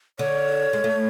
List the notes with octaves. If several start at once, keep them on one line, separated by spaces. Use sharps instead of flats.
D3 C#5
G#3
A3